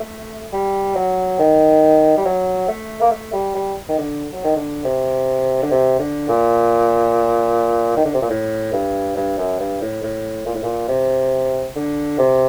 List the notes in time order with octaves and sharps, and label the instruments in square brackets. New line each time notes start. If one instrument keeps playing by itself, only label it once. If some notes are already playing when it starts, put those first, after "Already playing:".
Already playing: [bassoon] A3
G3
F#3
D#3
G3
F#3
A3
A#3
A3
G3
G3
D#3
D3
F#3
D#3
D3
C3
D3
C3
D3
A#2
D#3
D3
C3
A#2
A2
G2
G2
F#2
G2
A2
A2
A#2
A2
A#2
C3
D3
C3